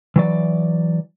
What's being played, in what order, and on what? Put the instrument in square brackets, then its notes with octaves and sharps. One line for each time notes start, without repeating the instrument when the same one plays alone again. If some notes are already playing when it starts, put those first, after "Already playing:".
[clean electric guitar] E3 F#3 D5